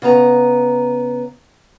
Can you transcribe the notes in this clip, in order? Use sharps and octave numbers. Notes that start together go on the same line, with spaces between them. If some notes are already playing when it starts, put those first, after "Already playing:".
C#3 B3 A5 A#5